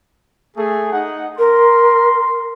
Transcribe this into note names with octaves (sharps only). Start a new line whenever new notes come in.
A3 G#4
D#4 F#5
A#4 C6